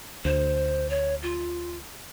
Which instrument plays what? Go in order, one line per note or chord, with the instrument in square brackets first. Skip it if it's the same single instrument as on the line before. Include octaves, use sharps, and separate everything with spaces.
[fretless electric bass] D2 [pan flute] C5
[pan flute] C#5
F4